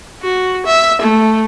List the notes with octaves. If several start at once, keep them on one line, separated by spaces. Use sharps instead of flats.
F#4
E5
A3